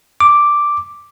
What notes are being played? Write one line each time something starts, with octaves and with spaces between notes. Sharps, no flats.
D6